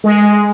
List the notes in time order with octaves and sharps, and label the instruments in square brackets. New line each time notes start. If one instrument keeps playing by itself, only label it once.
[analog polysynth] G#3